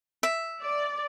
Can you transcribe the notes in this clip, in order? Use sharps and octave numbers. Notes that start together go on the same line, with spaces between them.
E5
D5